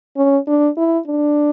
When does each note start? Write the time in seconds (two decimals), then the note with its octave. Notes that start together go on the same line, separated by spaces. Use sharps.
0.17 C#4
0.47 D4
0.78 E4
1.08 D4